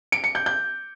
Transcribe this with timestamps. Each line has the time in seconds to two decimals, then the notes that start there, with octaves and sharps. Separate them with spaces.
0.12 D7
0.24 C#7
0.35 G6
0.46 G6